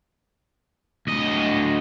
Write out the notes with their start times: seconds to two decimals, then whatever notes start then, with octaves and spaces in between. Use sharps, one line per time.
1.07 D2 D#5